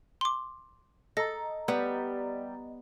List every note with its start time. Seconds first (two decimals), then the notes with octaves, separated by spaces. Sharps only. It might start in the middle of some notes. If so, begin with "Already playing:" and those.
0.21 C6 D6
1.17 A4 D#5 A#5 A#6
1.68 G3 B3